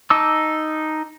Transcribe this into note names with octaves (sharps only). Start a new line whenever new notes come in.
D#4 A5 D6 E6